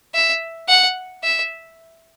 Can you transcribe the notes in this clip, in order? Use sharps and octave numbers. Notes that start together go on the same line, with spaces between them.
E5
F#5
E5